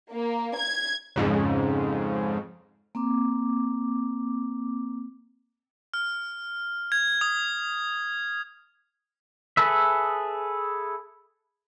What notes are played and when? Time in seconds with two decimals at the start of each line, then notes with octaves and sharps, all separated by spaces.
0.11 A#3
0.57 G#6
1.16 F2 G#2 C#3
2.95 A#3 C4 D6
5.94 F6
6.92 G#6
7.21 D#6
9.57 G#4 A4 B4 E5